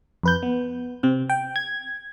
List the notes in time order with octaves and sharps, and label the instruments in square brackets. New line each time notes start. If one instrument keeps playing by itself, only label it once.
[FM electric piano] F2 B4 G6
B3
C3 C4
G5
G#6